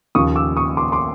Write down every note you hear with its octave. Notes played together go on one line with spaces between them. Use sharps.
D#2 C#3 F3 C#6 D#6
D6 E6
C#6 D#6
C6 D6
C6 D6